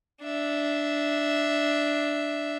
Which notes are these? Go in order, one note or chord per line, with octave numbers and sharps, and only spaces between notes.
D4 E5